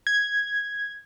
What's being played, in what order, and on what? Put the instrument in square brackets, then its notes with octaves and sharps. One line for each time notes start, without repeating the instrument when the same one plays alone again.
[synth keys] G#6